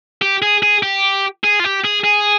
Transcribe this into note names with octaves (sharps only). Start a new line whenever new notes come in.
G4
G#4
G#4
G4
G#4
F4
G4
G#4
G#4